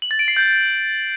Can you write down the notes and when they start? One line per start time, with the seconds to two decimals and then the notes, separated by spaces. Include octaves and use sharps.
0.02 F#7
0.11 A6
0.19 D7
0.28 C7
0.37 G6